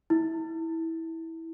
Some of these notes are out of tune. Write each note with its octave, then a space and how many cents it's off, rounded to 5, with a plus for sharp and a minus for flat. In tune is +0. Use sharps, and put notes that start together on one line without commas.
E4 -15